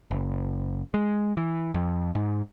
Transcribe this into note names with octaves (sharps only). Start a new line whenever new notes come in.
F#1
G#3
E3
F2
G#2